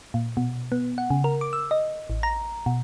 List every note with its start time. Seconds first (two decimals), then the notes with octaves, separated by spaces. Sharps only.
0.14 A#2
0.37 B2
0.72 B3
0.98 F#5
1.10 C#3
1.24 A#4
1.41 D6
1.53 E6
1.71 D#5
2.10 A1
2.23 A#5
2.66 B2